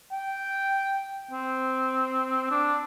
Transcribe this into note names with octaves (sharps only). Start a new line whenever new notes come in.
G5
C4
D4